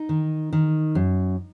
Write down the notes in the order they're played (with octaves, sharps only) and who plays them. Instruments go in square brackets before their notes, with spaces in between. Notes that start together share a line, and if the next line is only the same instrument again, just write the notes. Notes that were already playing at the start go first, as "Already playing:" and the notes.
Already playing: [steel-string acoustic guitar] D#4
D#3
D#3
F#2